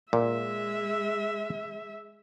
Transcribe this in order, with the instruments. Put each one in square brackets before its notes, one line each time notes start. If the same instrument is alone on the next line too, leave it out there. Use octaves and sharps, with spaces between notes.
[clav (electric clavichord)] A#2 [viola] G#3 E5